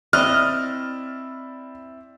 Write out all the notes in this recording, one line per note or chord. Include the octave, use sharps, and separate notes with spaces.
C4 E4 D5 D#5 F6